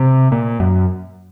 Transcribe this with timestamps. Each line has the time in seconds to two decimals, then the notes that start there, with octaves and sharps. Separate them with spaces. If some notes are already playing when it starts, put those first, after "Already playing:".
Already playing: C3
0.32 A#2
0.60 F#2